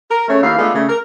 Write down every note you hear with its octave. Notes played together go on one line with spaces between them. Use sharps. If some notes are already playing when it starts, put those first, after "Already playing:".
A#4
C#3 A3 C#5
D#2 E4 F5
G#3 A3 B3 D4 F4 A4
C#3 A3
A#4